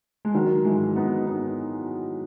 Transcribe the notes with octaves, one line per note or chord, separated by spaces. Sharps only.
G#3
D#3 F#3
E3 G#3
B3 D#4
B3 D#4